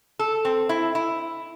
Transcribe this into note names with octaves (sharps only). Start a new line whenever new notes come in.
A4
C4
E4
E4